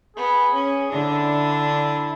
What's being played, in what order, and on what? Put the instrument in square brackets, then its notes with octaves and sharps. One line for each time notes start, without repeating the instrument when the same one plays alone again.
[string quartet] B3 [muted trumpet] G#4
[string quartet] C#4
[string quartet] D3 D4 [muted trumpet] E4